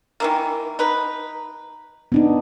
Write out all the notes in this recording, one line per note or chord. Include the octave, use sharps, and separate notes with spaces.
D#3 E3 A#3
D#4 B4
B3 D4 D#4